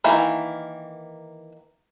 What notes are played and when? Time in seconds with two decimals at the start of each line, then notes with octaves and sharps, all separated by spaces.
0.04 D#3 E3 A#3